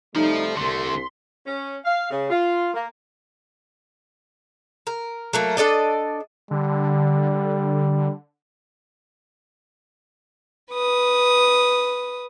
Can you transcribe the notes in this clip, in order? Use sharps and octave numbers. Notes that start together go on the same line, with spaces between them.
C3 F3 G3 A3 D#4
C2 D3 A3 C6
C#4
F5
C#3
F4
A#3
A#4
F#3 A3 A#3
D4 A4 D5 D#5
D3 G3
B4 D#6